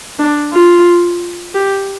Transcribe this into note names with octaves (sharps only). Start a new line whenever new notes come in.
D4
F4
G4